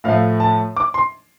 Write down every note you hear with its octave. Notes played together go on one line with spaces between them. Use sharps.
A2 F3 A3 F5
A5
D6
C6